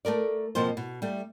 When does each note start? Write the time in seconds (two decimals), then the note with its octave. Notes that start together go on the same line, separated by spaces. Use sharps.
0.05 A3 A4 A#4 D5
0.55 F2 B2 F3 A#3 A4 C5
0.77 B2
1.02 G3 A3